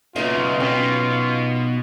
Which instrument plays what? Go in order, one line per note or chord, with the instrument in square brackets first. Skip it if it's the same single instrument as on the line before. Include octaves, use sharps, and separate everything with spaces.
[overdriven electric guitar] B1 C#3 [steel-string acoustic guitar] F#3 B3 D#4 [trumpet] F4
[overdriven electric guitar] B2 [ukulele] C#4 D#5 G5